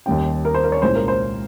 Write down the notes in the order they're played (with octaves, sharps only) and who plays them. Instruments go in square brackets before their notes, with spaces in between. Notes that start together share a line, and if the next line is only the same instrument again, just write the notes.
[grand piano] D#2 D#3 G3 C#4 G5
A#4
C5
A#4
C#5
C2 A#2 G#3 C#4 C5
A#4
C5